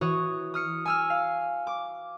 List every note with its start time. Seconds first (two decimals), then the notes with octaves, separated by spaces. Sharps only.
0.01 E3 F#4 C#5 D#6
0.54 D#6 F6 C#7
0.85 G#5 E6 F6
1.10 F5
1.67 D6